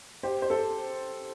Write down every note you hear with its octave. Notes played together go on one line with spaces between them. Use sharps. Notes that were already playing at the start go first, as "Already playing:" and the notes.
G4 C5
C5
A4